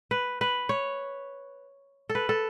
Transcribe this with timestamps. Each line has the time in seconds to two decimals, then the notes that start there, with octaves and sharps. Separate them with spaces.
0.11 B4
0.41 B4
0.69 C#5
2.09 A4
2.15 B4
2.29 A4